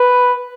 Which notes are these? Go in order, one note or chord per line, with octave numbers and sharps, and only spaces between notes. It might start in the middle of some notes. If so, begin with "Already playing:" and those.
Already playing: B4